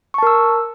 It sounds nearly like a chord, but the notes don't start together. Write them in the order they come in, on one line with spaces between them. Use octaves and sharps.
C#6 A5 A#4 E6